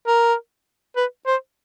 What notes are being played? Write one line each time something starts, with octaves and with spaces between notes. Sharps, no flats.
A#4
B4
C5